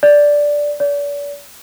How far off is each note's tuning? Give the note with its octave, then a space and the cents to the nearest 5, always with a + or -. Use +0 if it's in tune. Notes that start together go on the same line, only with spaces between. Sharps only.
D5 -5
D5 -40